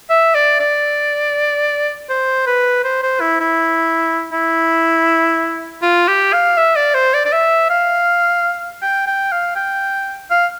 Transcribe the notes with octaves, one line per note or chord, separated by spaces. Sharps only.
E5
D5
D5
C5
B4
C5
C5
E4
E4
E4
F4
G4
F5
E5
D5
C5
D5
D5
E5
F5
G5
G5
F5
G5
F5